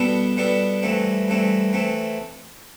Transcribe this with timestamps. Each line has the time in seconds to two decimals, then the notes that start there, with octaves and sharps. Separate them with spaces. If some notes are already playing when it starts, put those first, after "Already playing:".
Already playing: B2 G3 B3 D4 A4
0.37 B2 G3 B3 D4 A4
0.82 G2 E3 A3 C4
1.28 G2 E3 A3 C4
1.73 E3 A3 C4